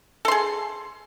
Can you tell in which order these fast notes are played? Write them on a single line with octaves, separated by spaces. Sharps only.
A4 C6 G#4